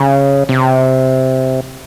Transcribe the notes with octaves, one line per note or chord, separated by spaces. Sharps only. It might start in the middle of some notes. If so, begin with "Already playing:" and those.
Already playing: C#3
C3